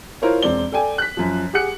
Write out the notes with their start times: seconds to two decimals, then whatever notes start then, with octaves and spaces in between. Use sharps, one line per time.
0.22 E4 F4 A#4 C5 C#5
0.42 E1 C4 D5 G7
0.72 A4 D5 G5 G#5
0.98 F#6 B6
1.17 F#2 F3
1.53 G4 G#4 F#5 F#6 C#7